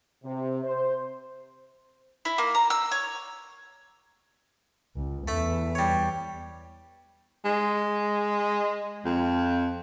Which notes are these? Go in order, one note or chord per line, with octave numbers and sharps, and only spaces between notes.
C3
C5
E4
A#3
A#5
E6
C#5
C#2
E2 A3 E5
G3 C#5
G#3
F2